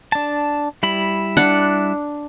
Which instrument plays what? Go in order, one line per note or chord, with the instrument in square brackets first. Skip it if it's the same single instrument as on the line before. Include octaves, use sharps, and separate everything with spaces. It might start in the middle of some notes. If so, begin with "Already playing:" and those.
[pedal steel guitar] D4 A5
G3 E4 B5
[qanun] D4 F#5